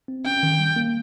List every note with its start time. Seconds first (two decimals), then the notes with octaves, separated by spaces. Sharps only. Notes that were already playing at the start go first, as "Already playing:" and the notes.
0.08 C4
0.25 C#4 G5
0.43 D#3
0.60 G3
0.76 A#3